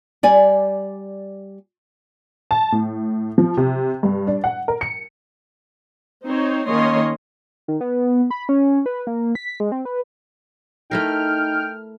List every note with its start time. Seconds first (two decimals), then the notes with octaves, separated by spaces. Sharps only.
0.23 G3 D5 G#5
2.51 A5
2.72 A2
3.38 F3
3.57 C3
4.03 G2
4.27 D4
4.44 F#5
4.68 A#4
4.81 C#7
6.24 C4 D#4 C5 C#5
6.67 D#3 A#3 C#4 C#5 D#5 C6
7.68 D#3
7.81 B3
8.31 B5
8.49 C#4
8.86 B4
9.07 A#3
9.35 B6
9.60 G#3
9.72 C4
9.85 B4
10.91 A3 D#4 E4 A#4 G5 F6